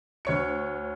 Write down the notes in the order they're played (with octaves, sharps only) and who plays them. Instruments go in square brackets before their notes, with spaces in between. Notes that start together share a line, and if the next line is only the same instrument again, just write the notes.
[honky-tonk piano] D2 C#5 C#7